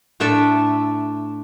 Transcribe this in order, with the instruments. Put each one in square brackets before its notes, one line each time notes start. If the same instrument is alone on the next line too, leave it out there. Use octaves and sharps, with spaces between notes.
[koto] A2 A3 D4 A4 D5 E5